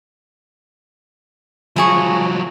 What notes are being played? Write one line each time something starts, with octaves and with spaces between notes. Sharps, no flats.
F3 F#3 E4 G#4 C#6